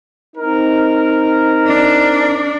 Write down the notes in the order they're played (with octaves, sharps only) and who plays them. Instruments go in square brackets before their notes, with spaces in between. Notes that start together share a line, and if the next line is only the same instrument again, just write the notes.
[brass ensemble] C4 D#4 A#4
[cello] D4